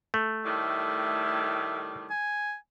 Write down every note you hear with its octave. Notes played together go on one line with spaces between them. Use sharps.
A3
A2 D#3 G3 E5
G#5